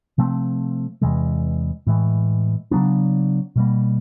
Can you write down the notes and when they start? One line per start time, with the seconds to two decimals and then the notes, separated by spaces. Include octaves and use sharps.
0.18 C3 F3 A3 C4
1.02 E2 C3 E3 G#3
1.87 A2 E3 G#3
2.71 C#3 F#3 B3 D4
3.56 B2 G3 A#3